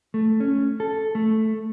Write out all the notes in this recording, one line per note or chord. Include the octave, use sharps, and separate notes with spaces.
A3
C#4
A4
A3